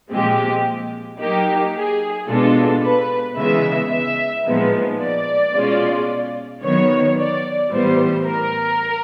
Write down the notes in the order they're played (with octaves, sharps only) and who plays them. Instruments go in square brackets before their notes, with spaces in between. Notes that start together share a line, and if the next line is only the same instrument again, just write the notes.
[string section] A#2 F3 G#3 C4 G4
F#3 A#3 D#4 G4
G#4
B2 G#3 B3 D4 F4 A4
B4
C#3 E3 G#3 B3 E5
E5
A#2 F3 G#3 B3 D#4
D5
B2 G#3 C#4 F4
D#3 F#3 B3 C#5
D5
A2 E3 G3 B3 C5
A#4